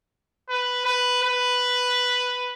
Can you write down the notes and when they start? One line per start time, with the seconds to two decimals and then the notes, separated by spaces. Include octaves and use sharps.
0.49 B4
0.85 B4
1.23 B4